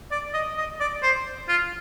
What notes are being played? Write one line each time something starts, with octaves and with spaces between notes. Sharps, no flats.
D5
D#5
D#5
D5
C5
F4